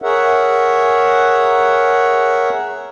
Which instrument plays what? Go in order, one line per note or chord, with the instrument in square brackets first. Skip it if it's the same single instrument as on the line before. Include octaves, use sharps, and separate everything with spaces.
[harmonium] G#4 A#4 C#5 E5 F#5